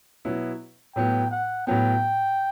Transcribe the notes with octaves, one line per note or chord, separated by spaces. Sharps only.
B2 F#3 B3 E4
A2 F#3 B3 G5
F#5
A2 F#3 B3 G5